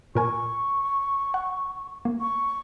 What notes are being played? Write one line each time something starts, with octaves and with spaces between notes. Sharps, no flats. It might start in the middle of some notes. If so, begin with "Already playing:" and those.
A#2 A#4 G#5 C#6
F#5
A#3
C#6